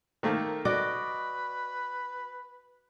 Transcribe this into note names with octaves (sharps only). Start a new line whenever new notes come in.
D#3 A3 A#3
F#4 B4 D5 D#5 D6